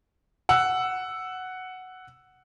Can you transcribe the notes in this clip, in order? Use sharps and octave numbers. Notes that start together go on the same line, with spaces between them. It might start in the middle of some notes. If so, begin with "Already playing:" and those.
F#5 E6